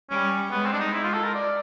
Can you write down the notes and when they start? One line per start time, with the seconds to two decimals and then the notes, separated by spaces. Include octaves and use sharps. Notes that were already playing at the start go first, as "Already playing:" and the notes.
0.10 G3 C#4
0.51 G#3 B3
0.66 C4
0.73 D4
0.80 D#4
0.93 E4
1.03 F4
1.14 A4
1.24 A#4
1.35 D5